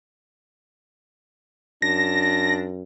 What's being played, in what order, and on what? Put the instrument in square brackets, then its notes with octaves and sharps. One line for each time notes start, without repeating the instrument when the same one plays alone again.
[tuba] F#2 [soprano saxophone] D4 [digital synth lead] A#6